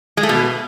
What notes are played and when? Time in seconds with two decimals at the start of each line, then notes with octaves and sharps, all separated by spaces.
0.17 G#3
0.23 A3
0.29 B2